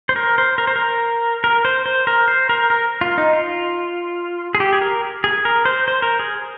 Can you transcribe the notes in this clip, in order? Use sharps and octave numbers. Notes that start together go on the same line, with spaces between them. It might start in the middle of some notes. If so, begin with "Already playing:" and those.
C5
A#4
C5
A#4
C5
A#4
A#4
C5
C5
A#4
C5
A#4
A#4
F4
D#4
F4
G#4
G4
G#4
A#4
G#4
A#4
C5
C5
A#4
G#4